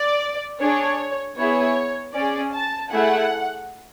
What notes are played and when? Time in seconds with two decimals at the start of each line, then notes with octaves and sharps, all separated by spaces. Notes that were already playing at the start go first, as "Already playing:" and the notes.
Already playing: D5
0.60 D4 G#4 C#5
1.37 B3 E4 G#4 C#5
2.14 C#4 G#4 D5
2.53 A5
2.91 A3 E4 G#4 F#5